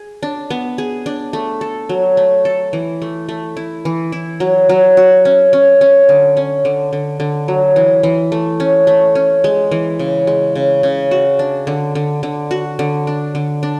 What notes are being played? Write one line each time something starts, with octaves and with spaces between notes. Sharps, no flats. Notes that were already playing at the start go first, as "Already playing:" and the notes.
Already playing: G#4
D4
B3
G#4
D4
A3
A4
F#3
A3
A4
E3
A3
A3
E4
E3
E4
F#3
F#3
F#4
C#4
C#4
C#4
D3
C#4
D3
D3
D3
F#3
E3
E3
A3
C#4
A3
C#4
G#3
E3
C#3
G#3
C#3
C#3
F#4
D4
D3
D3
D3
F#4
D3
D4
D3
D4